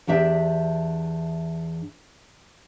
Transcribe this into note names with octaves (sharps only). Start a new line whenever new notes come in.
E2 D4 G4 E5